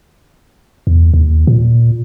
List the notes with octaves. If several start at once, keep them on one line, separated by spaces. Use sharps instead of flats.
E2
D#2
A#2